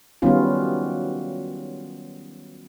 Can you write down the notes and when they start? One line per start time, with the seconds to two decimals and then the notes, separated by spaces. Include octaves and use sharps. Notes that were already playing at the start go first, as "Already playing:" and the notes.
0.22 D#3 F#3 G3 B3 C#4 F4